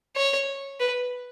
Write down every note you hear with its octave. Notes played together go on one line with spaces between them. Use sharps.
C#5
B4